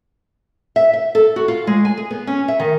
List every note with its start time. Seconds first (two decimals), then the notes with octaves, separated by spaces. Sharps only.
0.76 E5
0.93 E5
1.15 A4
1.36 F#4
1.48 F4
1.67 G#3
1.85 G#5
1.97 G#4
2.11 B3
2.27 C#4
2.48 E5
2.60 D#3